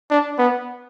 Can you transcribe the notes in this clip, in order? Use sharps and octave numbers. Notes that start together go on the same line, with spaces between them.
D4
B3